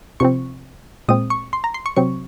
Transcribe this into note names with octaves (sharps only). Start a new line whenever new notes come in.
C3 F3 C4 C#6
A#2 G#3 C4 D#6
C#6
C6
A#5
C6
C#6
C3 F#3 C4 C#6